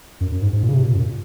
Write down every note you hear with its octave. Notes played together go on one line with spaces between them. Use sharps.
F#2
F#2
G#2
G#2
A#2
C#3
C3
A#2
F#2